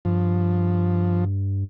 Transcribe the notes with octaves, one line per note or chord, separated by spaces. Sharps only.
G2 F3